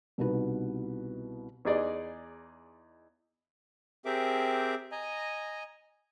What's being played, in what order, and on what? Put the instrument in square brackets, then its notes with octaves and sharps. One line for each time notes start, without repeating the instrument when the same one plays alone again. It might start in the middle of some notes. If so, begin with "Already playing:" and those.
[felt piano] C2 B2 D#4 B4
[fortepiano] E2 D#4 G#4 D5 D#5
[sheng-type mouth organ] C4 G4 G#4 A#4 E5 D6
D#5 G#5 A#5